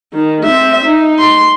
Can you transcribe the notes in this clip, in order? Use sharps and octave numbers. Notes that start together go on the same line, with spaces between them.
D#3
C4 E5
D#4
C6